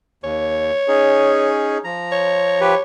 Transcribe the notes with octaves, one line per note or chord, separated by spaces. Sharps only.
D#2 C#5
C#4 D#4 G#4
F3 A#5
C#5
F3 G4 B4